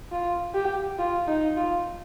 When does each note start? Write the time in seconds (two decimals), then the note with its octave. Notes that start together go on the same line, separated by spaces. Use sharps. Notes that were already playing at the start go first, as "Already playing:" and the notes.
0.12 F4
0.54 G4
0.99 F4
1.27 D#4
1.57 F4